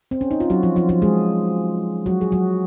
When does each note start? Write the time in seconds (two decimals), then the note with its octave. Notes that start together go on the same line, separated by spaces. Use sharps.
0.11 C4
0.21 C#4
0.31 D#4
0.40 F4
0.50 F#3 F#4
0.63 F3 F4
0.76 F3 F4
0.89 F3 F4
1.02 G#3 G#4
2.06 F#3 F#4
2.21 G#4
2.32 F#3 F#4